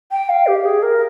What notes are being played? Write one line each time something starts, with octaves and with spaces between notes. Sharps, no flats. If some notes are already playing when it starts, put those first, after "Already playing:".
G5
F5
G4
G#4
A#4